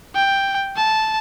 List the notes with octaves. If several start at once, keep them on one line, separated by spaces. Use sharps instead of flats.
G5
A5